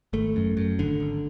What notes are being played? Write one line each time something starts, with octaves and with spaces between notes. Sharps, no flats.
G#1 A3
F#2
F#2
G#1 D3
G#1